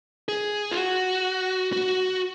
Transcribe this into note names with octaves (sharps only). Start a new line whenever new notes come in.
G#4
F4
F#4
F#4